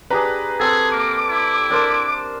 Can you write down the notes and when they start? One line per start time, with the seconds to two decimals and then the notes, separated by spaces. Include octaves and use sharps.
0.10 D4 G4 G#4 B4 A#5
0.60 C4 G#4 A4
0.92 A#3 D6
1.30 E4
1.70 D4 A#4 C5